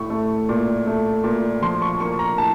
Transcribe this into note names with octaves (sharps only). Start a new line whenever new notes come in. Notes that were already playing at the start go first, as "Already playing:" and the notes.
Already playing: A2 C#6
A3
A#2
A3
A#2
F3 C6
C#6
A#3 C#6
A#5
A2 A5